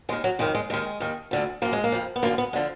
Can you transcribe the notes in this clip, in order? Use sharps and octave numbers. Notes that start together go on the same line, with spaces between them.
D#2 D#3 G#3
F#3
F2 D#3 G#3
G#3
D#2 D#3 G#3
D#2 D#3
D2 D3 F3
F#2 F3 A#3
G#3
A#3
F2 F3
B3
F#2 D3 F3 A#3
B3
D3 F3 G#3